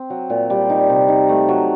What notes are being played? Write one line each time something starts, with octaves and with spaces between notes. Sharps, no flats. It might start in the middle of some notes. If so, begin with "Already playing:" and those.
Already playing: C4
F#3
A#2
G3
D#4
C3
D#4
A3
F#3